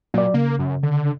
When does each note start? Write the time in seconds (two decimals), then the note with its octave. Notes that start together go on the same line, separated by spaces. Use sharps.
0.14 A#2 F#3 D5
0.34 C#3 A#3
0.59 F#2
0.83 D3